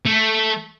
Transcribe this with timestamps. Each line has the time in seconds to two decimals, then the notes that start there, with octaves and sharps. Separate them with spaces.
0.05 A3